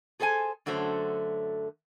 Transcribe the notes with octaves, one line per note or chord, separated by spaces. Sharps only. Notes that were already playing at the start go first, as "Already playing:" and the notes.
G#4 A4 C5 E5 G#5
F#2 D3 F#3 A3 C5